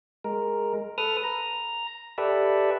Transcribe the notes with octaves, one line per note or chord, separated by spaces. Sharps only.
G#3 A#4
A4 B4 D#6 F6
A#5
G4 A4 B4 D5 E5